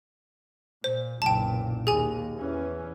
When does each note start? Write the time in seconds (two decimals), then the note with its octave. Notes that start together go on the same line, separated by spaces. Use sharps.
0.84 A#2 C5
1.22 F#1 B1 A#2 G5 A5
1.87 D#2 G#4 G#5
2.38 E2 E3 C#4